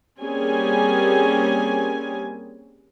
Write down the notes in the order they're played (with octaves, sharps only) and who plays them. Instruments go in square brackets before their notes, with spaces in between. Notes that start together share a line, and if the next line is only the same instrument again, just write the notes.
[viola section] G3 A#3 C4 C#4 G#4 G#5